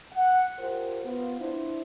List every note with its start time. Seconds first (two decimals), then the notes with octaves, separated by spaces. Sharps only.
0.13 F#5
0.59 F4 G4 A#4 C5
1.05 B3 F4
1.40 D4 E4 C5